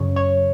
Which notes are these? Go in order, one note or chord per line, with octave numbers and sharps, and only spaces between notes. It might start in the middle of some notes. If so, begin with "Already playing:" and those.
Already playing: F#2 C#3 C#5
C#5